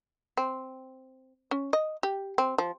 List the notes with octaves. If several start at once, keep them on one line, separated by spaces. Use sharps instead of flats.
C4
C#4
D#5
G4
C4
F3